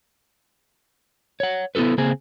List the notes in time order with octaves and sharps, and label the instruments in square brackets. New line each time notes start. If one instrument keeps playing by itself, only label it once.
[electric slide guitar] C#5 F#5
B3 E4 G4 A4 B4
C#3 A#3 C4 G#4